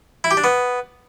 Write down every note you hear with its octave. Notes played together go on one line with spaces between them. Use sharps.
E4
G4
D4
B3